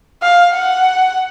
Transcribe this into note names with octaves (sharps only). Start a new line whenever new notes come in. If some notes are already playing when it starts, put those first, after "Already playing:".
F5
F#5